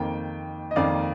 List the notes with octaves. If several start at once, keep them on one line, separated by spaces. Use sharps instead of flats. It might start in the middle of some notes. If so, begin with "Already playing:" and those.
Already playing: F2 D#3 A#3 G5
D#5
F2 D#3 A#3 D5 F5